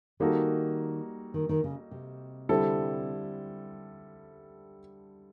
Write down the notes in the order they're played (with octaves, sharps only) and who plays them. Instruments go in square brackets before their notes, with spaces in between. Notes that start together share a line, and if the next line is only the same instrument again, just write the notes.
[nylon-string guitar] D#3 [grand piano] G3 A#3 D#4 F#4 A4
[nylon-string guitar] D#3
D#3
C#3
C3
[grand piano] D3 G3 C4 E4 A4